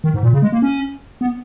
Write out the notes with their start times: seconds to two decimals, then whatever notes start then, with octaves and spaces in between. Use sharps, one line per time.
0.04 D#3
0.14 G#2
0.23 A#2
0.33 C#3
0.42 G#3
0.52 A#3
0.62 C#4
1.21 B3